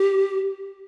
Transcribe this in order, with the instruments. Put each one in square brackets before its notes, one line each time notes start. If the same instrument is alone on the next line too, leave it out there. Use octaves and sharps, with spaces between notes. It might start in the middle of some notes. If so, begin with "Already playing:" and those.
Already playing: [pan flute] G4